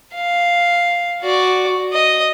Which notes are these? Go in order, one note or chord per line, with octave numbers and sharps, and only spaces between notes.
F5
F#4 D5
D#5